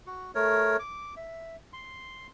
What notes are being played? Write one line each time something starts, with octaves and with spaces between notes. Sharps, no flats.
F#4
A3 A#4 C#5
D6
E5
C6